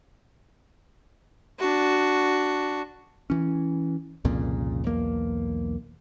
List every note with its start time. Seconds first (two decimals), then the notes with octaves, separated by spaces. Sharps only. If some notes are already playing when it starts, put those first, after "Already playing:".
1.59 D4 F#4
3.30 E3 C#4
4.25 C2 F2 A#2 C#3
4.84 B1 E2 A#3